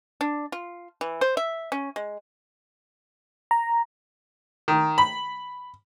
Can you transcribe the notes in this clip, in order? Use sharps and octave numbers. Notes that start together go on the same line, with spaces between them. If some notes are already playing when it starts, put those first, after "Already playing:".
D4
F4
E3
C5
E5
C#4
G#3
A#5
D#3
B5